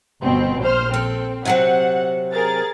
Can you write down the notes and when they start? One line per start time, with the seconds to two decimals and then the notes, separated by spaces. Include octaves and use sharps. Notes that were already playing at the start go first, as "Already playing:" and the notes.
0.22 G1 B2 C4
0.61 A#1 C5 F6
0.94 C4 A4
1.45 C3 F#3 C4 F#5
2.33 G#4 A#4 A6